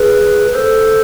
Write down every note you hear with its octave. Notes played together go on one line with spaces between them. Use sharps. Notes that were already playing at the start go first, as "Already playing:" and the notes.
Already playing: G#4 B4
A4 C5